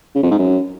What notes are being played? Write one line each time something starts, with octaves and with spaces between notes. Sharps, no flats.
C#3
F2
G#2
F#2